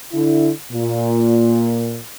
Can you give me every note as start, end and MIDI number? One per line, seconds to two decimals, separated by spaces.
0.13 0.50 50
0.13 0.50 64
0.72 1.99 46